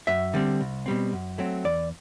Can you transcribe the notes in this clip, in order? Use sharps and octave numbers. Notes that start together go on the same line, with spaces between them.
F#2 E5
D3 G3 C4
C2
B2 G3 C4
F#2
F#3 A3 C4
E2 D5